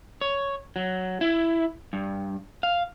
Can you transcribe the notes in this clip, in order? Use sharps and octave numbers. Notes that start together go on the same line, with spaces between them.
C#5
F#3
E4
G2
F5